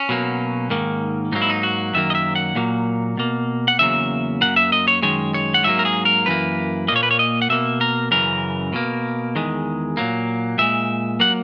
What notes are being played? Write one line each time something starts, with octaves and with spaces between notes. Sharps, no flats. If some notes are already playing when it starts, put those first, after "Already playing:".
Already playing: C#4
B2 F#3 A#3
G#2 D#3 A#3
G#2 F#3 A#3 D#4
E4
D#4
F#4
F#2 D#3 F#3 A#3 E5
D#5
E5
F#5
A#2 F#3 A#3
B2 A#3
F#5
E2 C#3 F#3 A#3 E5
F#2 E3 A#3 F#5
E5
D#5
C#5
F#2 D#3 G#3 C#5
C#5
F#5
G#2 F#3 A#3 E5
A#4
G#4
A#4
F#2 E3 A#3 B4
A#2 A#3 C#5 D#5
B4
C#5
D#5
F#5
B2 A#3 E5
A#4
F#2 C#3 E3 A#4
B2 A#3
E2 D#3 G#3
A#2 F#3 A#3
A#2 G#3 E5
F#3 A#3 F#5